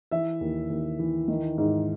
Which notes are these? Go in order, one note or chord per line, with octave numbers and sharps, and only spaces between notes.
E3 E5
D#2
D#2
E3
D#3
G#2